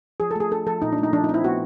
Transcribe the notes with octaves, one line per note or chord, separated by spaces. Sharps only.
F3 G#4
A4
A3 G#4
D4 A4
F3 A4
A#2 D#4
D4
A3
D#4
F3 D4
D#4
C4
E4
B3 F#4